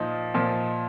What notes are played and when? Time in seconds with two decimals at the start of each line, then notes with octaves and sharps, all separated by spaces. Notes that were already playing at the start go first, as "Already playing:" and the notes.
Already playing: A#2 F3 D#4
0.34 A#2 F3